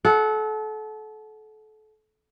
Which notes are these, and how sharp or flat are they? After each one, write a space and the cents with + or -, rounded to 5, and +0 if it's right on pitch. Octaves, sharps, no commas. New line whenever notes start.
A4 -30 F#5 +0